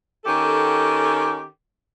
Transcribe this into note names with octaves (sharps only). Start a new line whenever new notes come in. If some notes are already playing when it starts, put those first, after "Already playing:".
D#3 C#4 G4 A4